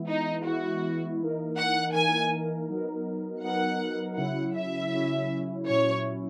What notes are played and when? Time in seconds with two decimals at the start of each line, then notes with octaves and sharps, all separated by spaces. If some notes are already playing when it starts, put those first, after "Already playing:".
Already playing: E3 G#3 B3 E4
0.08 D#4
0.45 E3 G#3 B3 E4 F#4
1.20 E3 A#3 D#4 A#4
1.57 F#5
1.94 E3 A#3 D#4 A#4 G#5
2.69 F#3 B3 D#4 A#4
3.43 F#3 B3 D#4 A#4 F#5
4.17 C#3 F#3 C#4 E4 F#5
4.54 E5
4.92 C#3 F#3 C#4 E4
5.65 A#2 F#3 C#4 E4 C#5